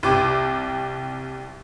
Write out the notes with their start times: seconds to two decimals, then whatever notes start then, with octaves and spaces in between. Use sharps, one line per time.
0.03 C2 G4 D6